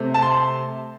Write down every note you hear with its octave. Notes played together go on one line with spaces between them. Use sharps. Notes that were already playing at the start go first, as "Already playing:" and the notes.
Already playing: C3 A3 C4
A5
C6